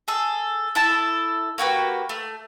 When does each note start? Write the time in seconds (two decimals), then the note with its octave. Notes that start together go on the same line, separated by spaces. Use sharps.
0.08 G#4 A4
0.75 E4 A4 A5
1.58 A#3 F#4 G4 B4
2.09 A3